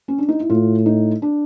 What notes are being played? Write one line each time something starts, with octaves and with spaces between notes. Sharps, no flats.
C#4
D4
D#4
E4
A2 F4
D#4
D4